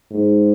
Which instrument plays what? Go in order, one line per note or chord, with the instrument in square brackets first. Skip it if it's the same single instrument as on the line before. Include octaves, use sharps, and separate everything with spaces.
[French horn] G#2